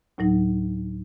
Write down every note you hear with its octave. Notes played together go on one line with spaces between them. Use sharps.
D2 A2 F#3 D#4